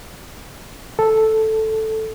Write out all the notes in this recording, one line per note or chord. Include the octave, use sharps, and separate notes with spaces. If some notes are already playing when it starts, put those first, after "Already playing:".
A4